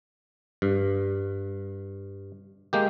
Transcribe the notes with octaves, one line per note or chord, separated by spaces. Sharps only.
G2
G#3 A#3 G4